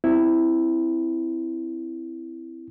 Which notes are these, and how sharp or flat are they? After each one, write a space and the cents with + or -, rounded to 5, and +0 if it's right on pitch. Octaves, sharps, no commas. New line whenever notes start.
C4 -10 E4 +0